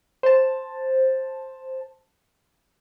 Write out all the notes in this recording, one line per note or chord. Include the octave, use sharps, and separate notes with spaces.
C5 A5